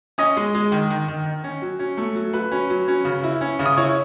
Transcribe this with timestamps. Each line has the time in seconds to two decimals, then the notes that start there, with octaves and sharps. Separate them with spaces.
0.18 C#4 D#5 D#6
0.37 G#3
0.55 G#3
0.72 D#3
0.90 D#3
1.08 D#3
1.26 D#3
1.44 C#4
1.62 F#3
1.79 C#4
1.97 A3
2.15 F#3
2.33 F#3 B4 B5
2.52 C#4
2.70 F#3
2.88 C#4
3.05 C#3
3.24 E4
3.41 C#4
3.59 C#3
3.66 D#6
3.77 E4 C#5 C#6